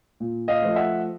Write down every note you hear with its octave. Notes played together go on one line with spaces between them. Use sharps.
A#2
D#5 F5
F3 A3
E5 F#5